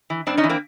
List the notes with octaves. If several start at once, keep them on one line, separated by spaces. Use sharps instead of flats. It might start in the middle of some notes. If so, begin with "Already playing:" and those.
E3
G2 C4 D4
C#4 D#4
E3
A#3 C4